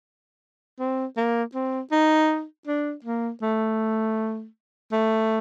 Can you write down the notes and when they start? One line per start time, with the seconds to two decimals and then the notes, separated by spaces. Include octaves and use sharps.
0.79 C4
1.17 A#3
1.54 C4
1.92 D#4
2.67 D4
3.04 A#3
3.42 A3
4.92 A3